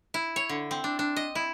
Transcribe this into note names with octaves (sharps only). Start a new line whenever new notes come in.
E4
C#5
D3
C4
D4
D4
D#5
E4